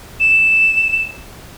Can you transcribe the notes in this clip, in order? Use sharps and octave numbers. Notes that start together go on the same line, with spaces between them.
E7